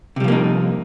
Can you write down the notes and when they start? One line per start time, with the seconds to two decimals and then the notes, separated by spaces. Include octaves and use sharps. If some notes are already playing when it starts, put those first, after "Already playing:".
0.16 C3
0.20 G3
0.24 F3
0.28 A#3
0.32 D#4